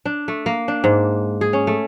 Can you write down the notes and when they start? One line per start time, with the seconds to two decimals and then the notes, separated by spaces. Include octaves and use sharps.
0.05 D4
0.28 A3
0.46 A#3
0.68 D4
0.84 G#2
1.41 G#4
1.53 C#4
1.67 A3